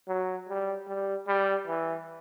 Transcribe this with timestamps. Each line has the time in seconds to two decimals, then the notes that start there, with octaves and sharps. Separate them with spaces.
0.08 F#3
0.49 G3
0.87 G3
1.27 G3
1.67 E3